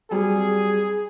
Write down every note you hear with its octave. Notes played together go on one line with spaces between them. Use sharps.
F#3 G3 C4 G#4